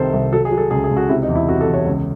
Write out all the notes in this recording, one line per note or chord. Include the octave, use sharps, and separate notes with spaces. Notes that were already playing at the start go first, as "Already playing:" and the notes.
Already playing: C2 C3 D#3 A4 C5
C2
F#3 A4
G#4
F#3
A4
C#2 G#4
G#4
C#2
F#4
C3 E4
D#4
E2
E4
C3 F#4
A4
E2
C#5
C#2